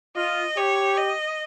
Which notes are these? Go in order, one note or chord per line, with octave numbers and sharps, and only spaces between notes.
F4 D#5
G4 C#5
D#5